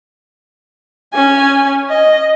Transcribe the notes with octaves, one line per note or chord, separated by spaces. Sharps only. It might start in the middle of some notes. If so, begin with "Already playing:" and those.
C#4 G#5
D#5